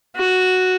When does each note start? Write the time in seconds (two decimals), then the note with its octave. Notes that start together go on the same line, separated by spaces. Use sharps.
0.16 F#4